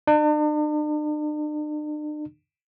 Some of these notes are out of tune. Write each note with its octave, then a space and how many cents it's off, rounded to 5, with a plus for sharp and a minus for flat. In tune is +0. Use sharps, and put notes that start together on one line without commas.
D4 +45